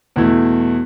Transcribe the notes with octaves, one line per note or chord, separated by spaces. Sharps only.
E2 B2 A3 E4